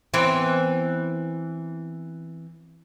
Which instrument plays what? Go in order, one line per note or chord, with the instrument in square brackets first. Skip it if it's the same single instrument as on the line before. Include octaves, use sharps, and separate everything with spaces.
[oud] E3 B3 C4